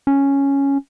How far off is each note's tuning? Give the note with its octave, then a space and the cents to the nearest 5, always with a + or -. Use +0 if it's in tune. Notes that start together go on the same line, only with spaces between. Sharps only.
C#4 +0